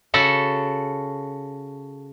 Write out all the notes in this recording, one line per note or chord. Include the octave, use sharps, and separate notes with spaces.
C#3 F#4 A4 A5